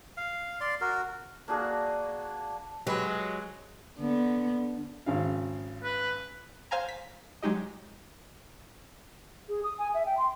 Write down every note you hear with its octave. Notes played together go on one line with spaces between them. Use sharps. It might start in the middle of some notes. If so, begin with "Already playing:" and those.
F5
D5 C6
F#4 A#4
A#3 D4 F#4 G#4
F#3 G#3 G4 B4
D3 B3
G#1 C#3 F5
B4
C5 F5 G#5 A#5
B6
F#3 G#3 D#4 G4 D#5
G#4
D#6
G#5
E5
G5
C6